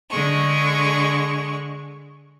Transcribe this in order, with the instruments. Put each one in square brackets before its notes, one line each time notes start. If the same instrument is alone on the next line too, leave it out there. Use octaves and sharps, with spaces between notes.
[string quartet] D3 G#3 C#6